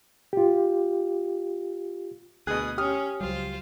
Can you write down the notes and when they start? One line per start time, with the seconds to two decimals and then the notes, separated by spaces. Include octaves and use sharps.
0.33 F4 G4
2.47 D2 B2 G#4 D#6 F#6
2.78 C#4 G4 D#6 F6
3.21 C#2 F#3 G3 F4 C5